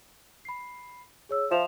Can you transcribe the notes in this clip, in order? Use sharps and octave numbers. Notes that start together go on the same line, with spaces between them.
B5 C7
G#4 C#5 E6
F3 E5 E7 F7